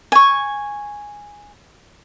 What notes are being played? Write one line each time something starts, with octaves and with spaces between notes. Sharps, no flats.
G#5 C#6